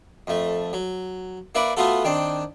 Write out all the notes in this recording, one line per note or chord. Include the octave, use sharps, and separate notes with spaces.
F2 A3
F#3
A#3 E4 B4 D5
A3 B3 F4 F#4 A4
D#3 C4 D4